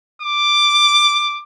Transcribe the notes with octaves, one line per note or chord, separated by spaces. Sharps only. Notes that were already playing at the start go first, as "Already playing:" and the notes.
D6